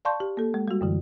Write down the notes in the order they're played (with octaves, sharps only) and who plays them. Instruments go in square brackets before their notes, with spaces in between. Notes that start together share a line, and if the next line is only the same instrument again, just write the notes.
[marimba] D5 F5 A5 C6 C#6 G6
G4
A#3 A4
G#3
G3 F#4
F#2 D3 E3